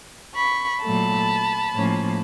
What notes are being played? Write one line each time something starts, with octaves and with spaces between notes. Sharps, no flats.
B5 C#6
A#2 F#3 A3 A5 B5
A2 F3 A#3 C#4